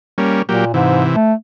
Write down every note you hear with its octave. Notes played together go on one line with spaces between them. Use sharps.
G3 A#3 C#4
A#2 F#3 A#3 G4
G#2 C3 E3
A3